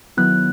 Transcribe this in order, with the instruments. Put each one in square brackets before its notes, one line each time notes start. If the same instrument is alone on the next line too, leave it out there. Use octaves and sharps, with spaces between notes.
[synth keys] D#3 F#3 B3 E4 [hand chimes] F#6